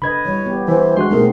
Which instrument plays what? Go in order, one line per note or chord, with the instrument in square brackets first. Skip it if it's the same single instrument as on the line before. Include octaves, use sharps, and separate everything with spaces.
[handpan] D3 B4 D#5 [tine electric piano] B5 G#6
[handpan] E3 G3 [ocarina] C#5
[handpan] B3 G4
[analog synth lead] E3 [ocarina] C5
[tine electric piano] G#3 F#4 F#6 [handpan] D4 [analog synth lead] C6
[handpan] B2 B3 C4 [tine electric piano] A3 G#4 A#4 [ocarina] D#4